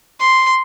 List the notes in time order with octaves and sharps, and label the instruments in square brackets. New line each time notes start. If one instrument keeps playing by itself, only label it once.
[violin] C6